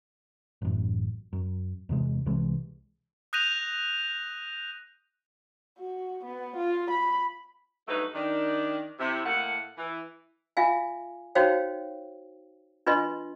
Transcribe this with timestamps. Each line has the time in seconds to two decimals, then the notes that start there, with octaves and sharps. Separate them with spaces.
0.62 A1 F#2
1.33 F#2
1.89 E2 C3 G#3
2.26 C2 C3 E3 G#3
3.33 D#6 F#6 G6 A#6 D#7 F7
5.79 F#4
6.25 B3
6.56 F4
6.91 B5
7.88 G2 F#3 A3 B3 D#4 B4
8.14 D#3 D4
8.99 C3 E4
9.25 A2 A3 A#3 F#5
9.77 E3
10.57 F4 E5 F5 G#5
11.35 D#4 F#4 C5 C#5 F5 G5
12.86 D4 F4 B4 D#5 C6